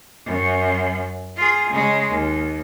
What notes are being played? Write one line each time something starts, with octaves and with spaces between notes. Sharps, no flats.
F#2
F4 G#4
C#3 G#3
D#2